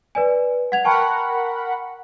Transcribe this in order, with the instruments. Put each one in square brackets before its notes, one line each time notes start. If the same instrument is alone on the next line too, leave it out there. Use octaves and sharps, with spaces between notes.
[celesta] B4 D5 G#5
F#5 G#6 F7
[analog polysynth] A#4 F#5 B5 [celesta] G5 A5 C#6